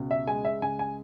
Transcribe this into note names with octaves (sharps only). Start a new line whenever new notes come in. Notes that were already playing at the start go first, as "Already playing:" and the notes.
Already playing: C#2 B2
E5
G#3 G#5
E5
C#2 G#5
G#5